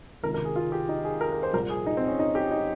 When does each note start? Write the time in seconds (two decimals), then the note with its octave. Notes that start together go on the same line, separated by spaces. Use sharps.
0.23 C#2 C3 D#3 A#4
0.34 A#4
0.45 G#4
0.56 F4
0.72 G4
0.89 D#4
1.04 G#4
1.21 A#4
1.32 A#4
1.43 C5
1.53 C2 A#2 F3 A#4
1.70 G#4
1.86 D#4
1.97 C4
2.08 C#4
2.19 D#4
2.35 G4
2.51 D#4